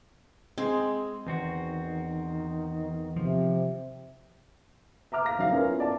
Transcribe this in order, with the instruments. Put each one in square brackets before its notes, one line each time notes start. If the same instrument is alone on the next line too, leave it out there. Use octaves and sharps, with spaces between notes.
[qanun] G#3 [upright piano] C4
[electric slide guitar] E2 C4 F#4 [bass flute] D#3
[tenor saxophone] C3 [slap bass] F3
[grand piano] E5 A#5 D6 F6
F5 A#6
F#3 D#4 F5
B3 C#4 E4 F4 A#4
D5 A5